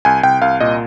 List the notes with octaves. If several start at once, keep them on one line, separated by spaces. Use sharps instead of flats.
C2 G#5
C2 G5
C2 F5
A#2 D#5